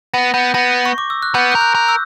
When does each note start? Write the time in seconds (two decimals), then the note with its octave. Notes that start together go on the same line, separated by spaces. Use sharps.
0.14 B3 A#6
0.34 B3 G6
0.54 B3 A#6
0.86 C#6
0.98 D6
1.10 E6
1.22 F#6
1.35 B3 G6
1.52 A#4 G6
1.61 F#6
1.75 A#4
1.89 E6